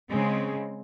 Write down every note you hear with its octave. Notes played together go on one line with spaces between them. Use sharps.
C#3 G#3 C4